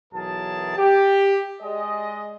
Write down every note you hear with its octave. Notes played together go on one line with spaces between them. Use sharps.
B1 E3 F#3 G#4 A#4 A5
G4
G#3 G#4 D5 D#5